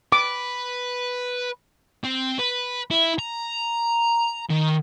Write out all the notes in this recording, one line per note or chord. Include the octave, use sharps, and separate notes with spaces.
B4 D6
C4
B4
E4
A#5
D#3